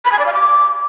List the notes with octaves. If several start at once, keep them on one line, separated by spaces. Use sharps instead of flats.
B5
G#5
D5
F5
D6